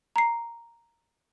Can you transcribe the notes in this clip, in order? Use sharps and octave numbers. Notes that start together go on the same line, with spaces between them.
A#5 C7